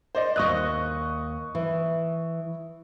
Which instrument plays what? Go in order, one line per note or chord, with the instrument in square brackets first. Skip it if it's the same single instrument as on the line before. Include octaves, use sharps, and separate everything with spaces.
[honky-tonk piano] C5 D5 D#5
[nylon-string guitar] D#2 D#5 [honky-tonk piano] C#6 D#6 F#6
[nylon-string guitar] E3